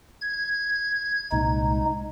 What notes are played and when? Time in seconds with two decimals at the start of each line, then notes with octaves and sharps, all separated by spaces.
0.21 G#6
1.32 C2 A#2 G#3 D#4